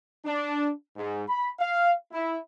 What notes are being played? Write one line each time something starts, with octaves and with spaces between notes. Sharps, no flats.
D4
G#2
B5
F5
E4